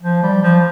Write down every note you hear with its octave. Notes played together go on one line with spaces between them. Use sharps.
F3
G3
F3